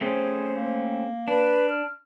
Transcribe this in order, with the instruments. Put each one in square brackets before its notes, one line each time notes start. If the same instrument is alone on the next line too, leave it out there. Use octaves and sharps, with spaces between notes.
[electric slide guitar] A3 C4 C#4 [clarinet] G#4 [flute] C5
[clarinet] A#3
[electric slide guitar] D4 [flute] B4
[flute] F6